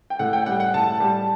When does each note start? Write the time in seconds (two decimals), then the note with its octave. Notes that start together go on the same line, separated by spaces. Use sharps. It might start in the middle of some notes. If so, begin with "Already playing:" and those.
0.10 G5
0.19 A2 F#5
0.33 G5
0.46 G3 F#5
0.60 F#5
0.74 A2 A5
1.00 G3